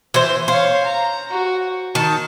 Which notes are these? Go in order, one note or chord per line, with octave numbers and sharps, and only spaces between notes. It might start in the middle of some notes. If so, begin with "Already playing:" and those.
E3 C5
C5 C#5 F5
A#5
F#4
D#3 A5